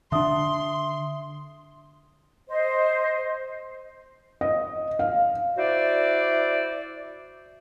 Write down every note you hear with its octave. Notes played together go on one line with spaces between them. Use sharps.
D3 D4 E5 C6 D#6
C5 D#5
D#5
F5
E4 F#4 C5 D5